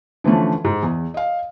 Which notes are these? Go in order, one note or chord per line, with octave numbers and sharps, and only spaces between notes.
D3 E3 F3 A3 C#4
G#2
E2
D#5 F5